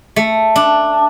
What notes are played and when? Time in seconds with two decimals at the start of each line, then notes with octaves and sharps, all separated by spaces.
0.16 A3
0.56 D4